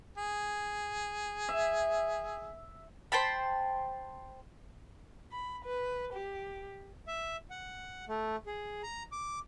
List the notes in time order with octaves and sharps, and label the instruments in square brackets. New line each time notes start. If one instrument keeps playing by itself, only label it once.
[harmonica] G#4
[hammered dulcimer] E5
[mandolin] C5 G5 A5 B5
[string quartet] B5
B4
G4
[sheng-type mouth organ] E5
F#5
A3
G#4
A#5
D6